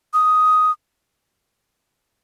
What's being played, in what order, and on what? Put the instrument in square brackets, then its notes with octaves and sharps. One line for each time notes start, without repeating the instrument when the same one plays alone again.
[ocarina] D#6